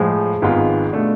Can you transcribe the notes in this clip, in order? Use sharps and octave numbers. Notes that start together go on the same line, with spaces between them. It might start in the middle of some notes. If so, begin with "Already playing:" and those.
Already playing: A2 F3 G#3
G#1 G#2 G#3 B3 F4
B2 A3 D4